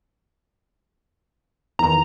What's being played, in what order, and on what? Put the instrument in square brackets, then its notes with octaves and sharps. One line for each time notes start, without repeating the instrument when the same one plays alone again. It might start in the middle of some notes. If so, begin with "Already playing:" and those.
[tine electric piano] E2 D#3 E3 [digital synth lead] A#5